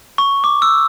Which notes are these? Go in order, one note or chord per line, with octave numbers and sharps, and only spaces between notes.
C#6
D6
E6